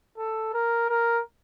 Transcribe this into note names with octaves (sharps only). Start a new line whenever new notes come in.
A4
A#4
A#4